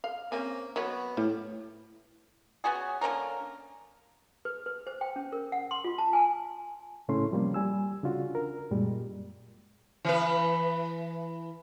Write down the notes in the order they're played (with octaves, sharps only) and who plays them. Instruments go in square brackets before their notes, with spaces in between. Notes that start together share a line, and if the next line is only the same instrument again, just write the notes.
[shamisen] F5
[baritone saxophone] A#3 [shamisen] C4 C#4 G#5
[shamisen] F#3 B4 C#5 [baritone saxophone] B3
[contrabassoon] A2 [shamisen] G3
[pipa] B3 C#4 F#4 G#4
D3 A#3 C#4 A#4
[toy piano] B4
B4
C5
G5
C#4
A#4
F#5
C6
F4
A5
G#5
[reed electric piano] A2 C#3 A3 C#4 E4 C6
C3 F3 G3 A#3
G3 G#5 E6
C#3 D4 F4 F#4
A#4
F#2 A#2 G3 G#3
[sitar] E3 B4